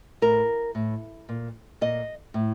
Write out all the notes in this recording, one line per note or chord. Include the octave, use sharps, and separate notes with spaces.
A2 A#4
A2
A#2
A#2 D#5
A2